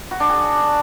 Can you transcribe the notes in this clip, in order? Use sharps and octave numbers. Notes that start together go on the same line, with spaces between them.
F#4
D4
G#4